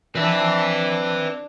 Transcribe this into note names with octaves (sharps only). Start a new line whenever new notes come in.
F3 C4 D4 B4 E5 A5 E6